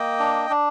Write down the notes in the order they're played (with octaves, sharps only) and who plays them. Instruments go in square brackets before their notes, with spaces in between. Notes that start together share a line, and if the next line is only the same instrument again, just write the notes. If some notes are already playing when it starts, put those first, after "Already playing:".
Already playing: [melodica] A#3 D#5 G5
D4
D4